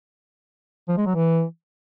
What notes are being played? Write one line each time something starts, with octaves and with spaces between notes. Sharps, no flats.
F3
G#3
F#3
E3